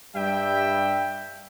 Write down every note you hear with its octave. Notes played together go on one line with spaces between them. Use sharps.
G2 G3 E5 G5